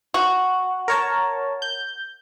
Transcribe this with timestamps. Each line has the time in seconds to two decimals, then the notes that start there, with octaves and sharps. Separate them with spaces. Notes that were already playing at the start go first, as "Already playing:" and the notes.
0.14 F#4
0.88 A#4 C#5 A5
1.62 G6